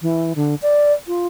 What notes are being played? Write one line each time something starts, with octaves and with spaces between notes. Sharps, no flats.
E3
D3
D5
F4